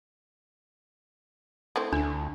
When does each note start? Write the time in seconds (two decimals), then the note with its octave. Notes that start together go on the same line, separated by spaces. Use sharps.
1.76 A3 C4 E4
1.93 D2 D4